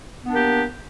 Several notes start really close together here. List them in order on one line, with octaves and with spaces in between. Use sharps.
B3 D4 A#3 G4